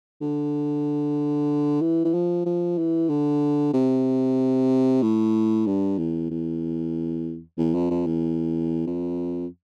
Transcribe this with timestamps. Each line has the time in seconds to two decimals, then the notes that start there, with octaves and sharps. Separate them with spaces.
0.21 D3
1.81 E3
2.05 E3
2.14 F3
2.46 F3
2.78 E3
3.09 D3
3.73 C3
5.02 A2
5.66 G2
5.98 E2
6.30 E2
7.58 E2
7.74 F2
7.90 F2
8.06 E2
8.87 F2